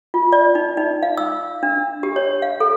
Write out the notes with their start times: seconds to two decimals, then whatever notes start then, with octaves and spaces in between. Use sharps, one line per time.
0.14 F4
0.32 D5
0.55 D#4
0.77 D#4
1.03 F5
1.17 E6
1.63 D4
2.03 G4
2.16 C#5
2.42 F5
2.60 A4